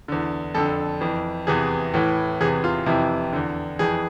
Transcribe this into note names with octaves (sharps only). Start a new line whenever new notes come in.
E2 D3
F2 D3 A4
F2 E3
E2 C3 E3 G#4
A2 E3
E2 C3 E3 G#4
F4
F2 C3 E3 E4
E2 D3
F2 E3 G#4